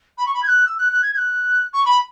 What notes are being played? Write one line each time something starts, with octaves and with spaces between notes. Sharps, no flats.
B5
C#6
B5
G#6
F#6
E6
F#6
F#6
G#6
G#6
F#6
C#6
B5